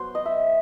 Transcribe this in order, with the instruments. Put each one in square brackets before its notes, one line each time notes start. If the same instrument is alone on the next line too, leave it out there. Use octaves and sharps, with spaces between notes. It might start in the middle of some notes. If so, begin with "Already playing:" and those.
Already playing: [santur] F#3 B3 C5
D#5
E5